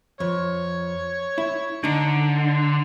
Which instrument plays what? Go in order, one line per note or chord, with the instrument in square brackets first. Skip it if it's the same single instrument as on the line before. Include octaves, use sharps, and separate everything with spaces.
[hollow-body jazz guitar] F2 [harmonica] C#5
[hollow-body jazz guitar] E4
[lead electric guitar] D3 [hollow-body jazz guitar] D4 D#4